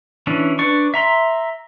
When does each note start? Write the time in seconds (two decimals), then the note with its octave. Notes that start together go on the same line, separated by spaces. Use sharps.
0.27 E3 C#4 D4
0.59 D4 B4 D5 C#6
0.94 E5 A#5 C6